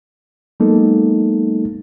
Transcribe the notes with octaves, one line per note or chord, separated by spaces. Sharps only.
F#3 G#3 A#3 B3 D#4 A4